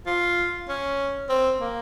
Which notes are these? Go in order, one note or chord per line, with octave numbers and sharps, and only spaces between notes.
F4
C#4
C4
A#3